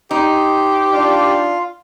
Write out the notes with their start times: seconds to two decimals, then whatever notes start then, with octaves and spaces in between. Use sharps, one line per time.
0.11 D#4 G4 C5
0.93 D4 F4 F5